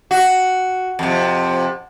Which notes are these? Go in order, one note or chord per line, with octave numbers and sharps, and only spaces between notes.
F#4 F#5
F2 C3